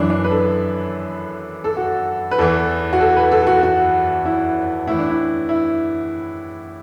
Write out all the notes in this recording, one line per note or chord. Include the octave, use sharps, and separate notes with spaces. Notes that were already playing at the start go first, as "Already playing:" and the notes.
Already playing: F#2 E3 D4
D4
B4
A4
A4
F#4
B4
E2 E3 A4
F#4
A4
B4
A4
A4
F#4
F#4
E4
A2 E3 E4
D4
E4
E4